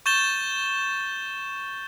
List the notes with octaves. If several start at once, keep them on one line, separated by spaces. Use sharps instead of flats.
C#6 G6 A6 E7 G7